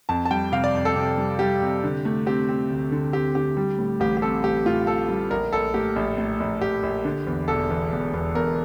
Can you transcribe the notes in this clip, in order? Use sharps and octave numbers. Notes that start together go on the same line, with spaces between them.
F2 A5
A5
G3 G5
C3 F5
D5
F2
A4
C3
G3
G3 G4
C3
D3
A3
C4 G4
C4
D2
D3
C4 G4
D3 G4
G3
A2
A1 G4
G4
C4 A4
A1 G4
A2 F4
A2 A4
G3
A#1 A#4
A#1 A4
A2 G4
A#1
A2
A#1
A#1 G4
A#1
D3
E2
E1 A4
E2
E1
E2
E2 A#4